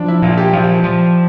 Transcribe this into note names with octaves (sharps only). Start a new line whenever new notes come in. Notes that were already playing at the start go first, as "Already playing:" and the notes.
Already playing: F3 D4
E4
A#2 F4
G4
F3 F4
F3